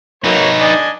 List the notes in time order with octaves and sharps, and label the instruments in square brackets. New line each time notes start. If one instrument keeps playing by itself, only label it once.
[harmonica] F#3 A#3 C#5 [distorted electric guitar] D#4 B4
[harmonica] D4 D#5 G#5